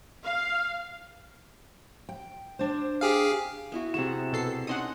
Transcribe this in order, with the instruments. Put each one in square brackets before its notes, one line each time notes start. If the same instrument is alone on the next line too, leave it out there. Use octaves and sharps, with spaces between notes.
[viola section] F5
[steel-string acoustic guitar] G5
D4 C5
[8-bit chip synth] G4 G#4 F5
[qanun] B3 E4 F#4
[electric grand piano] C3 E7 [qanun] F#4 G#4 F#5
[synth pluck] B2 A4 C7
[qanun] C#4 D#4 A4 [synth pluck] F#5 C6 D#6